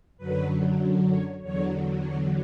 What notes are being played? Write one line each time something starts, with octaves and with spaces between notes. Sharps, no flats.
F#2 D3 F#3 B4
C#5
E2 D3 F#3 C#5
C#5